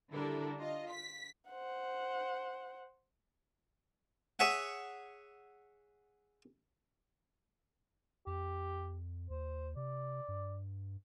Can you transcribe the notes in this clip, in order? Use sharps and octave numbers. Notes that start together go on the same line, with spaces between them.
D3 G3 D4 E4 A4 A#4
F4 D#5
B6
C5 F#5
G#4 C#5 E5 F#5
F2 G4
D#2 C5
C3 D5
G2